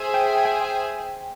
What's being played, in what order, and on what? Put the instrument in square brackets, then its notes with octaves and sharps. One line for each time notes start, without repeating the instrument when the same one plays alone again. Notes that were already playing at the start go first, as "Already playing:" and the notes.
Already playing: [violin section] G#4 C5 E5 G#5
[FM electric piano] G5
G5